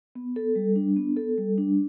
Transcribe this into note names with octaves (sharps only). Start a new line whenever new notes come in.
B3
A4
G3
D4
B3
A4
G3
D4